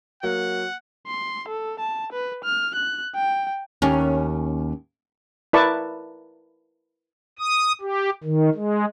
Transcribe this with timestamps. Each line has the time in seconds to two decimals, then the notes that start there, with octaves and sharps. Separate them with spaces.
0.23 F#3 A#3 F#5
1.07 C6
1.48 A4
1.79 A5
2.12 B4
2.44 F6
2.75 F#6
3.15 G5
3.82 D#2 C#4
5.53 E4 A#4 B4 D5 A5 C#6
7.39 D#6
7.81 G4
8.24 D#3
8.54 G#3